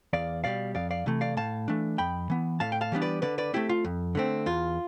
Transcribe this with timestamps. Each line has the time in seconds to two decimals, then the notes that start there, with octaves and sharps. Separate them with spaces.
0.13 E2 D5 F5
0.44 B2 G3 D5 F5
0.75 F2 D5 F5
0.91 D5 F5
1.06 C3 E3 A3
1.21 D5 F5
1.37 A2 F5 A5
1.68 E3 A3 D4
1.98 F2 G5 B5
2.30 E3 B3
2.60 A2 F5 A5
2.72 G5
2.81 F5 A5
2.92 E3 G3 B3 D4
3.02 B4 D5
3.22 D3 B4 D5
3.38 B4 D5
3.53 A3 C4 E4 G4
3.69 F4
3.85 F2
4.15 D3 A3 C4
4.46 E2 F4